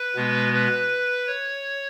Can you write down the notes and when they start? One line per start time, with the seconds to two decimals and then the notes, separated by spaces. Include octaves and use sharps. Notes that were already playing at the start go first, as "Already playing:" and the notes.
Already playing: B4
0.16 B2 G#3 B3
0.53 B4
1.27 C#5